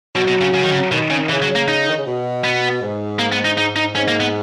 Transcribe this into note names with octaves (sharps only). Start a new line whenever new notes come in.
B2 F#3
B2
C#3
C#3
D#3
C#3
B2 D#3
C#3
C#3 E3
F#3
A#3
D#4
D#3
C#3
B2
B3
G#2
A#3
B3
D#4
G#2 D#4
D#4
G#2 C#4
A#3
B3